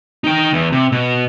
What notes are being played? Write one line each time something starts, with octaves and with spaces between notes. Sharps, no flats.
D#4 G5
E2
C3
B2